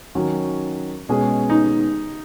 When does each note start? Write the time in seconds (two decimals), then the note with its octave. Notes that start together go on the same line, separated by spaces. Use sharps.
0.15 D#3 F#3 C#4 F#4
1.09 B2 G#3 C#4 G#4
1.50 D#4